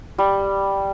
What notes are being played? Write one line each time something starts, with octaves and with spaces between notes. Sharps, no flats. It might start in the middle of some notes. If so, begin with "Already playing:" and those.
G3